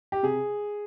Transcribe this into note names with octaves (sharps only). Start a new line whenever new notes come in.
G4
C3 G#4